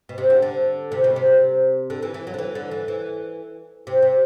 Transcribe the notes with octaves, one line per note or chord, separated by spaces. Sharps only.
B2
C3
D3
D3
C3
B2
C3
D3
E3
E3
F#3
D3
E3
D3
E3
E3
C3
C3